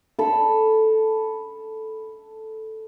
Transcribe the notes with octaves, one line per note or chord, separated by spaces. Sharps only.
A4 B5